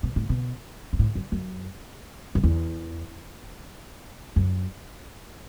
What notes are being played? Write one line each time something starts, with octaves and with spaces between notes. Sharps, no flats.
B2
A2
B2
G2
A2
F#2
F#2
F#2
E2
F#2